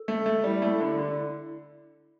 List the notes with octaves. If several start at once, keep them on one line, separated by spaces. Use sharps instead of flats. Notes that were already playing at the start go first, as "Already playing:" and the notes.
Already playing: A4
A3
A3
G3 E4
A3
D3
D3